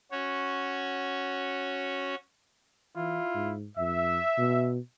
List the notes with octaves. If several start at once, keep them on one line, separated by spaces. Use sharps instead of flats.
C#4 F#4 C#5
E3 E4 F4
G#2
F2 E5
B2